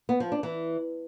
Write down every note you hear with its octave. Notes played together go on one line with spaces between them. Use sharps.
B3
F3
D4
E3